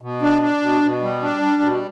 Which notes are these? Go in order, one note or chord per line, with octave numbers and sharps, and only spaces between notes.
B2
D4
D4
B2
B2
G3
D4
G3
B2